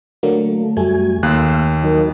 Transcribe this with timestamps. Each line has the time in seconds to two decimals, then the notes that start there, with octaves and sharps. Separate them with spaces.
0.23 D3 F#3 A3 A#3
0.77 F#2 G3 A3 F#4 G#5
1.23 D#2 A#3 F5 C6 E6 F#6
1.84 F#3 D#4 A#4